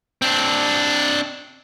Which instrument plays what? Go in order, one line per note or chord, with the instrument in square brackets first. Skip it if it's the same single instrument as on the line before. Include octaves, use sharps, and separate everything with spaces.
[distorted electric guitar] C4 D4